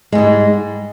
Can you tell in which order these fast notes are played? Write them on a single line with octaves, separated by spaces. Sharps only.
G#3 G#2 G3